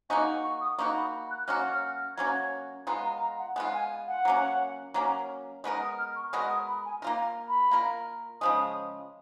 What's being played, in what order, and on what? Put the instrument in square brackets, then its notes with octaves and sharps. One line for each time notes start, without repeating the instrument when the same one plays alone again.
[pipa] A#3 D#4 F#4 [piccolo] G#5
[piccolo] C#6
D#6
[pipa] A#3 D#4 F#4 [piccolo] C#6
[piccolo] B5
B5
F#6
[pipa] F#3 A#3 C#4 F#4 [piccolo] F6
[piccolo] F6
F6
[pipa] F#3 A#3 C#4 F#4 [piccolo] G#6
[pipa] G#3 B3 F4 [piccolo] A#5
[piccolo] A#5
A#5
F#5
[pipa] G#3 B3 F4 [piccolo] F#5
[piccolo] G#5
F#5
[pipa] F#3 A#3 C#4
F#3 A#3 C#4
[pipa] G#3 B3 F#4 A#4 [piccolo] G#5
[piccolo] D#6
F6
C#6
[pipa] G#3 B3 F#4 A#4 [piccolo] D#6
[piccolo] D#6
B5
G#5
[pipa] A#3 F4 A#4
[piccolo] B5
[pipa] A#3 F4 A#4
[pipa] C#3 F3 G#3 [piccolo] D#6